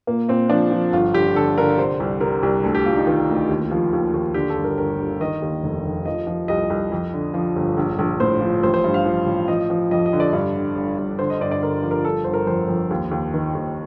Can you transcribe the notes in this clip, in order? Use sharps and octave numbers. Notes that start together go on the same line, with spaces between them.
A#2 A#3
A#2 C4
F3 D4
F3
G1 F4
D3 G4
D3 A4
D3 A#4
C3 C5
C2
C3 A#4
C2
D2 A4
G4
D2 F4
D#4
D#3 F4
D2
D#2
F3
D#2
D#2
D3 G4
A4
G1
A#4
G1 A#4
D3
D#3 D#5
D#2
F1
F1
F3 D#5
F3
C2 D#5
C2
F2
D3
F3
G1
A#1
A#1
A2 C5
F3
A1 C5
C5
G2
F5
F3
A1
F3 D#5
F3
F2 D#5
D#5
D3
D5
G2 D5
D3
G1
G2
D3 C5
D#5
G1 D5
D5
D3 A#4
F3
A#4
G1 A4
G1 C5
A#4
F2 C5
F2
D#2
D#2
D#3
D#2